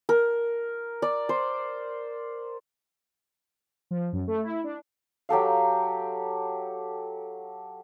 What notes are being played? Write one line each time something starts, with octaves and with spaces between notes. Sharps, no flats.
A#4
D5
C5
F3
F#2
A3
E4
D4
F#3 G4 A4 F5